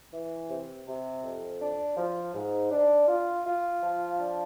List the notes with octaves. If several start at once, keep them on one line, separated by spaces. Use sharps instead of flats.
E3
C3
C3
F2
D4
F3
G#2
D4
F4
F4
F3
D4